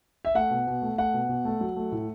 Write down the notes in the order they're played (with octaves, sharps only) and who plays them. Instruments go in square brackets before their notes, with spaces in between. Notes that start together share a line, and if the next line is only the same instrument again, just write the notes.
[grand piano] E5
A3 F#5
B2
B2
A3
A3 F#5
B2
B2
A3
F#3
A3
A2